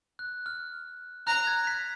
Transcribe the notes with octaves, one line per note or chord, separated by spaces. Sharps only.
F#6
F6
A#5 F#6
G#6
B6